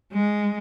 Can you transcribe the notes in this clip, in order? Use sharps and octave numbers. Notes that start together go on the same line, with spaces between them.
G#3